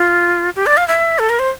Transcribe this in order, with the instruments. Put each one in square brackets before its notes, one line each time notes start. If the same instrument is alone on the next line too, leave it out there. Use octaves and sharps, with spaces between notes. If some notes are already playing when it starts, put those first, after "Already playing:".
Already playing: [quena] F4
G4
D5
F5
E5
A4
A#4
C5